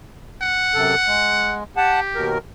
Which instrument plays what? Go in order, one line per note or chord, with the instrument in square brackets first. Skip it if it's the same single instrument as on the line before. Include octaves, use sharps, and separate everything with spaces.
[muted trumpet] F#5
[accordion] F#2 C3 A4
G#3
[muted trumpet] G4 [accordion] F#5 A5
[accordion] D#2 B2 A#4